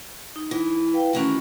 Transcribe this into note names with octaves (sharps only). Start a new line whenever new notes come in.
D#4
E3
B4 F5 G5
D#3 E3 A3 C#4 F#4